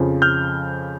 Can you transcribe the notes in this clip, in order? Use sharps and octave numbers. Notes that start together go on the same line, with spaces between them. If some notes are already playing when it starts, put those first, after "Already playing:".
Already playing: F2 C#3 F3
F6 G6